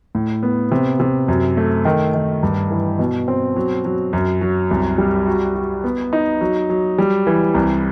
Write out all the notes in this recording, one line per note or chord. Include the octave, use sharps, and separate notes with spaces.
A2
B3
C3
C3
F#2
A3
D#3
D#3
G2
E3
B2
C4
F#3
F#3
F#2
F#3
C2
G3
F#4
F#4
B3
D#4
F#3
F#3
G3
E3
C2